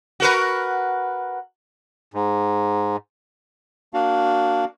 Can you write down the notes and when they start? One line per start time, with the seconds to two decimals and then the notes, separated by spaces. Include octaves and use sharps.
0.20 F#4 A#4 B4
2.14 G#2
3.94 A#3 D4 F#4 F5